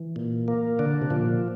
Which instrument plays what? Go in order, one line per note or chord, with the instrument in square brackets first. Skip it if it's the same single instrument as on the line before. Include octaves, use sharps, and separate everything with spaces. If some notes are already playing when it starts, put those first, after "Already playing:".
Already playing: [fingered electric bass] E3
[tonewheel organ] A#2
A#3
[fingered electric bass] D3 [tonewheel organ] D4
[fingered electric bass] C3
[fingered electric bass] A#2 [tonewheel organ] F3